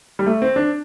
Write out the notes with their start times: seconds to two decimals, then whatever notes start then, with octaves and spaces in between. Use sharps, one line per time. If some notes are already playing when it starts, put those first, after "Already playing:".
0.19 G3
0.26 A3
0.42 C4
0.56 D4